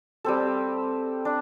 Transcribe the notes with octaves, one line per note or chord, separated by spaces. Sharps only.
G3 C4 A4
D4